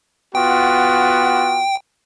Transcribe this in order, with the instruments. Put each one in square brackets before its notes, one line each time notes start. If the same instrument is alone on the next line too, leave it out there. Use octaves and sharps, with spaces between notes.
[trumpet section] B3 F4 F#4 [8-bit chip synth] G5